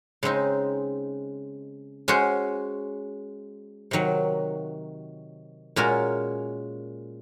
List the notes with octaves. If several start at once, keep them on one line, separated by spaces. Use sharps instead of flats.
C#3 G#3 C4 D#4
G#3 C#4 F#4 C5
C3 D#3 F#3
A#2 G#3 C#4 F#4 A#4